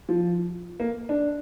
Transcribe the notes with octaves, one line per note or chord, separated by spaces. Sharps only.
F3
A#3
D4